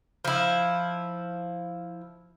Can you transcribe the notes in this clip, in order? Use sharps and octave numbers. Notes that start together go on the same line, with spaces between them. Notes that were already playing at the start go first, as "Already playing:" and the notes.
F3 E4